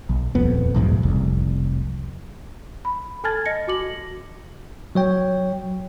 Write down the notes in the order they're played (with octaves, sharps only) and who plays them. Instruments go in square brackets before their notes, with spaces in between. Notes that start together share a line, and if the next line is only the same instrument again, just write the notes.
[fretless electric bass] B1
D#1 F2 B3
B1 E2 G#2 B2
F1 C2
[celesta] B5
A4 G#5 A5 F6 G#6 A6
D#5 A#6 C#7
F#4 D6 F#7
[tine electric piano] F#3 C#5 G5